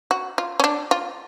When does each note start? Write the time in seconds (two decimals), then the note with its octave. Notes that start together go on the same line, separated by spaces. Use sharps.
0.11 F#4
0.38 F4
0.60 C#4
0.64 D4
0.91 F4